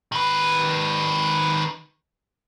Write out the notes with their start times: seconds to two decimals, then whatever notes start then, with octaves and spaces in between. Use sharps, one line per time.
0.12 D#3 B4